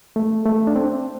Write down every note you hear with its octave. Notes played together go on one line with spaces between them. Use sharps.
A3
A3
D4
C4